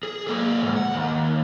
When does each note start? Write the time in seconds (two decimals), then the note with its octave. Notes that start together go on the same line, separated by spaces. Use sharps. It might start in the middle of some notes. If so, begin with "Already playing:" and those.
0.03 G#4
0.27 A#3 G#4
0.61 D2 G#2
0.76 F#5
0.94 D#2